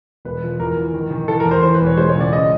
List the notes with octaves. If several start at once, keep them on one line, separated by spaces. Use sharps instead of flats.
E1 B4
F3
E2 A#4
E3
D#3
D#3
E3 A4
A#4
E2
C5
E3 C5
B4
E1
C#5
G#3 C5
C#5
C#2
D5
C#3 D#5